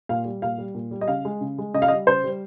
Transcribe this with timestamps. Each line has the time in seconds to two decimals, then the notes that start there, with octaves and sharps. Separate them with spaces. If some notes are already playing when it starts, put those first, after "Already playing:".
0.09 A#2 F5
0.25 G3
0.42 A#2 F5
0.58 G3
0.75 A#2
0.91 G3
1.01 D#5
1.08 C#3 F5
1.25 G#3
1.41 C#3
1.58 G#3
1.74 C#3 D#5
1.82 F5
1.88 D#5
1.91 G3
2.07 C#3 C5
2.24 G3